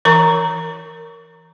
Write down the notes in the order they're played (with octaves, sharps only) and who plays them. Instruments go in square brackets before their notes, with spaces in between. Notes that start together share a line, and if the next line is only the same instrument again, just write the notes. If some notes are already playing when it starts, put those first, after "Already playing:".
[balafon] E3 A#4 A#5 C#6